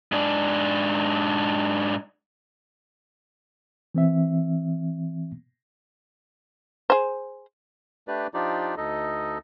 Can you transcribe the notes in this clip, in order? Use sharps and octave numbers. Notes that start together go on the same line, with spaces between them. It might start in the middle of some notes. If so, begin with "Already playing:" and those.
G#2 D4
E3 C4 E5
G#4 C5
A3 D4 G4 B4 D5
F3 D4 D#4 F4 G4 D5
D2 D#4 A4 D#5